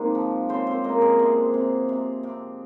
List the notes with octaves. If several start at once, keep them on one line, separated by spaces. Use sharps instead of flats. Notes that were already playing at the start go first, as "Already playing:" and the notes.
Already playing: D#3 G#3 A#3 C4 C5
F3
C#3 C4 C5
C4 C5
G#3 A#3 A#4
G#3 G#4
C3 G#3 G#4
C3
C3
C3